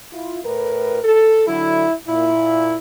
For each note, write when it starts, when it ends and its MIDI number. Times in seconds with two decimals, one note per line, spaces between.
0.13 0.39 64
0.13 0.39 65
0.44 1.00 45
0.44 1.00 70
0.44 1.00 71
1.04 1.47 69
1.48 1.86 50
1.48 1.86 54
1.48 1.95 64
2.08 2.75 46
2.08 2.77 64